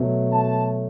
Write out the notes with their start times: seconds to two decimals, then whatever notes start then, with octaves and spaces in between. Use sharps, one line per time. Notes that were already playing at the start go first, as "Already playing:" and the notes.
Already playing: B2 F#3 A3
0.32 A5